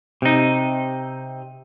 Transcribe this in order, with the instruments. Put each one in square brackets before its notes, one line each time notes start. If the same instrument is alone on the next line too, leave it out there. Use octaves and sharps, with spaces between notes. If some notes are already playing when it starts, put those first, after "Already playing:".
[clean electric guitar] C3 D#4